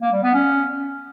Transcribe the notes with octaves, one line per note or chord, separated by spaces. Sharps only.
A#3
G3
B3
C#4